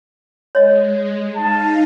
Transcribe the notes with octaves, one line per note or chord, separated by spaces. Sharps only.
G#3 C#5 D#5
D#4 F5 A5